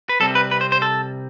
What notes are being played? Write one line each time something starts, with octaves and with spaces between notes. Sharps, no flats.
B4
C2 C3 G3 C4 A4
B4
B4
C5
C5
A4